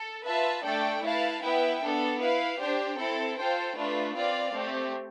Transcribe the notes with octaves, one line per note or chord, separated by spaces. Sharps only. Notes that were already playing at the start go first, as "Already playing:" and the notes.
Already playing: A4
F4 B4 E5 A5
A3 D4 A4 D5 G5
E4 B4 F5 A5
B3 E4 B4 E5 G5
B3 D4 A4
E4 B4 F5
D4 G4 C5 G5
C4 E4 A4
F4 A4 C5 G5
A3 D4 F4 B4
C4 F4 B4 D5 F5
A3 C4 G4